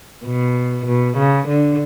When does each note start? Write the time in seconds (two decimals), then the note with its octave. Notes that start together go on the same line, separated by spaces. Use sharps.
0.24 B2
0.87 B2
1.18 C#3
1.48 D3